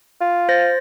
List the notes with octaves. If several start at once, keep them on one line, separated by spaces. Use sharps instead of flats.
F4
C5 A6 A#6